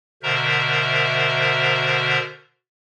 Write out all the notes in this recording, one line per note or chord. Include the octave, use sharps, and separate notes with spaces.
B2 D3 A#4 C5 E5 A#5